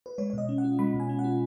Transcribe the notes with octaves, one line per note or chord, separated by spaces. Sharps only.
B4
G#3 C#5
C#5
B2 D#5
C#4
F#5
F4
G#3 B5
B2
G#5
C#4
F#5
F4